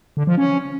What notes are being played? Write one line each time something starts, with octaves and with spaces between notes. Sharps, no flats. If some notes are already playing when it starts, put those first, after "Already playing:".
D3
F3
C#4